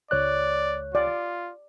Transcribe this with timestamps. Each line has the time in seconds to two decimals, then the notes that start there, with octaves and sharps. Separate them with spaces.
0.11 C#2 C#5 D5 F#6
0.95 F4 D5